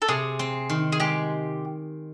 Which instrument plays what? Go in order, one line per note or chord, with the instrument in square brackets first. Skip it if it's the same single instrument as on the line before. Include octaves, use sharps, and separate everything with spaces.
[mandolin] A4
[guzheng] C3 [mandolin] G#4
[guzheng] C4
D#3
[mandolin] G#4
[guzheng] G#3 [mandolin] G4